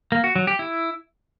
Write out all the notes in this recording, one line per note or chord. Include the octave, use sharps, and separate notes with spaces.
A#3
F#4
F#3
G4
E4